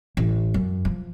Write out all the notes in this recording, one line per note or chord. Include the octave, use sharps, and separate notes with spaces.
A1
F#2
F3